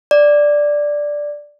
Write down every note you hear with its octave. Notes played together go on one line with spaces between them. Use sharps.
D5